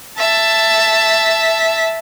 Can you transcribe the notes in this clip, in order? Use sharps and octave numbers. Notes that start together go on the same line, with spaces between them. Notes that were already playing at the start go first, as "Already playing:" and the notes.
E5 A5